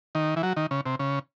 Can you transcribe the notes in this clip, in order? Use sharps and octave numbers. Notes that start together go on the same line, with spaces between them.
D#3
E3
F#3
D#3
C#3
C3
C#3